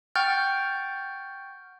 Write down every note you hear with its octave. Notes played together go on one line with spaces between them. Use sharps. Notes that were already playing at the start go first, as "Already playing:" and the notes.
F#5 G5 C#6 F6 G6 A6